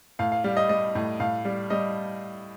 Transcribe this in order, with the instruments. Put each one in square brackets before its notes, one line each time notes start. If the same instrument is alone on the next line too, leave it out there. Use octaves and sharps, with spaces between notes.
[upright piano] A2 F5
F5
G3 F5
D#5
G3 D#5
A2
A2 F5
G3
G3 D#5